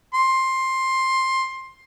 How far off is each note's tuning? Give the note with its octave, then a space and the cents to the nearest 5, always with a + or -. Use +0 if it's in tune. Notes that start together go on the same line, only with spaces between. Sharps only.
C6 +15